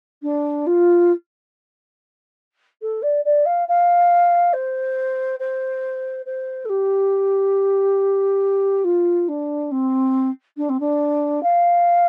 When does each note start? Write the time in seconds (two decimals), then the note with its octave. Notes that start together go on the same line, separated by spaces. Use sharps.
0.22 D4
0.67 F4
2.82 A4
3.02 D5
3.25 D5
3.46 F5
3.68 F5
4.53 C5
5.40 C5
6.26 C5
6.65 A4
6.69 G4
8.84 F4
9.28 D4
9.71 C4
10.57 D4
10.69 C4
10.80 D4
11.43 F5